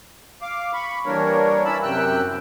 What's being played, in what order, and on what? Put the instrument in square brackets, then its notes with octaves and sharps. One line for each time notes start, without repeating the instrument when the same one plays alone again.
[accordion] F5 D6
B5 C#6
E3 G3 A#3 D4 A#4 C#5
C#4 E4 A5 B5 E6
F#2 C3 G5 E6 F#6